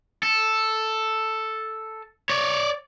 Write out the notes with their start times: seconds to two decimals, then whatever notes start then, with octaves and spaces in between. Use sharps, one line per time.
0.23 A4
2.30 C#5 D5